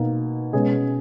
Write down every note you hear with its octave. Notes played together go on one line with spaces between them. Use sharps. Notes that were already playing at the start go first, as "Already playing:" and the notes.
Already playing: B2 A#3 D#4
B2 G#3 C#4 G#4